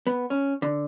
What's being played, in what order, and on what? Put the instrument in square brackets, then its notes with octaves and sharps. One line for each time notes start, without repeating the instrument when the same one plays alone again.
[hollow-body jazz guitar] B3
C#4
D3